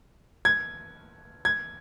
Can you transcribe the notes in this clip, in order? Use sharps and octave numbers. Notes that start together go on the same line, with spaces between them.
G#6
G#6